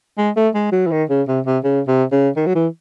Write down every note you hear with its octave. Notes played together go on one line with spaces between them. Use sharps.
G#3
A3
G#3
F#3
E3
D#3
C#3
C3
C3
C#3
C3
C#3
D#3
F#3
E3